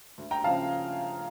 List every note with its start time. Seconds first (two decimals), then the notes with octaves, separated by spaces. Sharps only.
0.18 D2
0.31 G5 A#5
0.44 C#3 F3 F5 A5